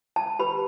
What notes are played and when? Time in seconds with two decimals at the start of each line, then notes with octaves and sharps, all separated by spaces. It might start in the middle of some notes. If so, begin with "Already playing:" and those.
0.16 A5
0.39 G4 B4 B5